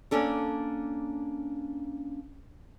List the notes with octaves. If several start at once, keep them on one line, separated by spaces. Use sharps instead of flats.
A#3 C#4 D4 A4